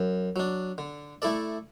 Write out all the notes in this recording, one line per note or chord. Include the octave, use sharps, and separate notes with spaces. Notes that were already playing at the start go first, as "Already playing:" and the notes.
Already playing: F#2
F#3 D4
D3
A3 E4 A4 D5